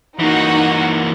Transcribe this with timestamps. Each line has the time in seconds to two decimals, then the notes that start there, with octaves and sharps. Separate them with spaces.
0.19 E3 A#3 D#4 F#4 F#5